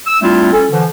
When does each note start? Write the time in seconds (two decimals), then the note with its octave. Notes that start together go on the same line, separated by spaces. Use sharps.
0.07 E6
0.22 G3 A3 C4 D4 E4 F4
0.53 C#4 A4
0.72 D3 E3 F3